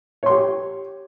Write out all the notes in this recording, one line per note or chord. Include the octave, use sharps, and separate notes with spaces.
G4 C#5 C6